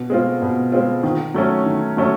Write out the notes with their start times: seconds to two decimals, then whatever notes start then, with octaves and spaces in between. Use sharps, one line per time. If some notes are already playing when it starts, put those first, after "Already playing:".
Already playing: B2
0.10 G#3 C4 F4
0.42 B2
0.72 G#3 C4 F4
1.03 D#3
1.34 F#3 A3 C#4
1.66 D#3
1.97 F#3 A3 C#4